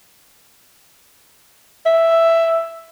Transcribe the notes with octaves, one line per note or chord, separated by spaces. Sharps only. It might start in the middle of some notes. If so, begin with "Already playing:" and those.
E5